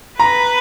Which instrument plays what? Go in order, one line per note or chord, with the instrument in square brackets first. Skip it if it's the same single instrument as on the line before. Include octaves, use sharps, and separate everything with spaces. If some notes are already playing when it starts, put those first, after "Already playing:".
[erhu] B4 [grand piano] A#5